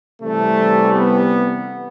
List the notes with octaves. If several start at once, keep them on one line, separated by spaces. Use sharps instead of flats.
C3 E3 G3 A3
B3